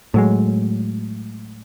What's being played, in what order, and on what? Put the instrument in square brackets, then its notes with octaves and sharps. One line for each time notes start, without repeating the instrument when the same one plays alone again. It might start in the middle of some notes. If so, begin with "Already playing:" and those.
[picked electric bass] A2 F#3 G#3